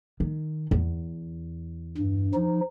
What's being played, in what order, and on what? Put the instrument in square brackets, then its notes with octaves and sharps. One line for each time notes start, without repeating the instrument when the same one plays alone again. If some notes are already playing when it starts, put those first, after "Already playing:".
[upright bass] D#3
E2
[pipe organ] G2
F3 D#4